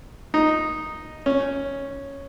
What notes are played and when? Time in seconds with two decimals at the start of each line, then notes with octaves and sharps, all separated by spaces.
0.34 D#4
1.26 C#4